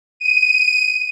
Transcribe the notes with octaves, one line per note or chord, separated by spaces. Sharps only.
D#7